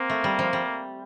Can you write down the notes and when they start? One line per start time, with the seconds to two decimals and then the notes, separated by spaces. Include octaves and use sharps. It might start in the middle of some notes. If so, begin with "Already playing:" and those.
Already playing: A#3 C4
0.10 A3
0.24 G3
0.39 F3
0.53 G3